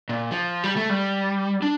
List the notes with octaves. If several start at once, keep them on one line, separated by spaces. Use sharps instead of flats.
A#2
F3
G3
A3
G3
D4